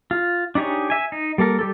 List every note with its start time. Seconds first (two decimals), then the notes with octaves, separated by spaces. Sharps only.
0.11 F4
0.55 D4 D#4 G4 G#4 C#5
0.90 E5 G#5
1.12 D#4
1.38 G3 A#3 A4 A#4
1.59 G3 G4 A4